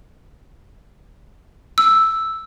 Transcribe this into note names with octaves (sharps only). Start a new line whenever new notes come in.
E6